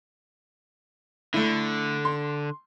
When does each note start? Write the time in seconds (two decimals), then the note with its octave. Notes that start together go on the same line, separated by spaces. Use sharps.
1.34 D3 A3 E4
2.05 C6